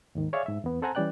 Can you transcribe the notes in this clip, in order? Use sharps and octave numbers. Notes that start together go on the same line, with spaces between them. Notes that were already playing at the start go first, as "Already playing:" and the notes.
D#2 G#2 D#3
G#4 C#5 D5 E5 F5
G#2 E5
E2 B3
C4 A4 C5 F#5 G#5 A#5
E3 G3 C#4 D5 G5 F#6